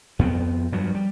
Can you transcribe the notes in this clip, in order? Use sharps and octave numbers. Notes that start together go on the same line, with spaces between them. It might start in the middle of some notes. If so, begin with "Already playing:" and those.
F2 B3 C4
G2 F3 F#3
G3